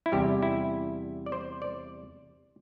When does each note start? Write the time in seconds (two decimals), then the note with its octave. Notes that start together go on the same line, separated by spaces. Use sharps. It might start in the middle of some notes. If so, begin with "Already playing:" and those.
0.06 E4
0.12 E2 C3 G3 G4
0.43 E4
1.26 D5
1.32 C5
1.62 D5